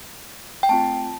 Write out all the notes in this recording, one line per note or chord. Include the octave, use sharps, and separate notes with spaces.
G5
A3 C4 F4 A5